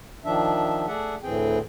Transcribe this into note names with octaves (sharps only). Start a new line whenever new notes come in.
D#3 F3 D4 E5
A3 G#4 D5 E5 F#5
D2 A2 E3 C4 G#4 G5